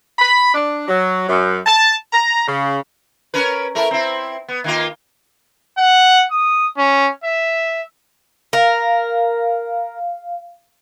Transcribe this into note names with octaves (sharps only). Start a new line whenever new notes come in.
B5
D4
F#3
F#2
A5
A#5
C#3
C#4 A#4 B4
A3 E4 A#4
C4 E4
B3
D#3 A#3 F4
F#5
D#6
C#4
E5
A#4 F5